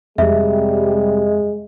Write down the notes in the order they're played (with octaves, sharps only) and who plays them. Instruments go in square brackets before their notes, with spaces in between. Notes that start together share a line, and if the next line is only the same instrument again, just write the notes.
[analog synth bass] F2 [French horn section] C3 G3 [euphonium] G#3 [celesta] E5